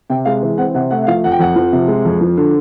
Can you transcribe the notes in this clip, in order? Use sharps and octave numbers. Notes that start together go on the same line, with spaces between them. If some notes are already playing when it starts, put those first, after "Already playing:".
C3 G5
G#3 F5
E3
C4 F#5
C3 F#5
A3 F#5
F#5
F3 F5
F2 F#5
G5
F2 F#5
F3
C3
G#3
F2
F3
D3